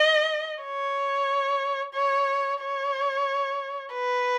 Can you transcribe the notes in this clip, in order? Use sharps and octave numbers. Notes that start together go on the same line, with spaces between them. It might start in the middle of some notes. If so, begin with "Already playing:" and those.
Already playing: D#5
C#5
C#5
C#5
B4